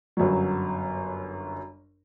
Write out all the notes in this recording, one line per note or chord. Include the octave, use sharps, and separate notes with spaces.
G1 F#2 F#3